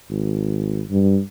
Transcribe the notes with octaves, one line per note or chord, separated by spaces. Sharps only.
G#1
G2